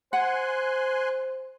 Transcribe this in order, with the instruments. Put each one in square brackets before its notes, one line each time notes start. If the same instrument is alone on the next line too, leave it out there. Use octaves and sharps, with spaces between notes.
[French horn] C5 [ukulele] F#5 [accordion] G#5 C6 F#6